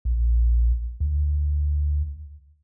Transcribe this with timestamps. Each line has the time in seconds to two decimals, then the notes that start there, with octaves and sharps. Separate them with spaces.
0.05 A#1
1.00 D2